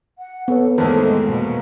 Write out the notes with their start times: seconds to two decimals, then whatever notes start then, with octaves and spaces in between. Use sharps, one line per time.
0.18 F#5
0.48 B3 A4 C#5
0.78 E2 A2 D#3 G#3 A#3 A4 C5
1.26 B2 A#3